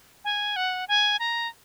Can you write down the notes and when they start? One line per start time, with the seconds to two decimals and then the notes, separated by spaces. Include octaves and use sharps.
0.24 G#5
0.56 F#5
0.88 G#5
1.19 A#5